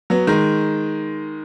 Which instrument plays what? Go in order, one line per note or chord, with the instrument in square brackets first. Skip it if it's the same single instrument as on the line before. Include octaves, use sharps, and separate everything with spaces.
[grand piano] F#3 B3
D#3 G#3